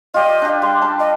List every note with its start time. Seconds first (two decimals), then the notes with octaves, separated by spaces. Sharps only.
0.14 F4 G4 D5 D#5
0.42 D4 G4
0.62 G3 C6
0.82 D4 A5
0.99 D#5